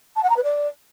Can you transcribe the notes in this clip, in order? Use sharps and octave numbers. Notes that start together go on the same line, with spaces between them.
A5
F#5
A#5
B4
D5